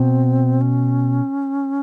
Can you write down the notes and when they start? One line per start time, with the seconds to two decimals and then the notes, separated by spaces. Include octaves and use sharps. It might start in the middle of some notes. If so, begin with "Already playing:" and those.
Already playing: B2 C4
0.61 C#4